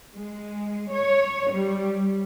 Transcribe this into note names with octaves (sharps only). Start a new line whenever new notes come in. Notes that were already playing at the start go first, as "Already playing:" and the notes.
G#3
C#5
G3